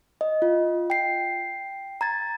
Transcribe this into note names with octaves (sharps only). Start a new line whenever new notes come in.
D#5
F4
G5 C7
A#5 G#6 A6